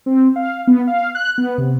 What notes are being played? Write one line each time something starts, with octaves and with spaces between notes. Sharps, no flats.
C4
F5
B3
F5
F#6
B3
C3